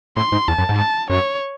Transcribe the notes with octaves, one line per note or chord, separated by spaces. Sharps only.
A2 C6
G#2
E2 A5
F#2
G#2
A5
F#2 C#5